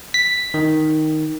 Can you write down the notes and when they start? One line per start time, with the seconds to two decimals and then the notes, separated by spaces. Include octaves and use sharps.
0.14 B6
0.54 D#3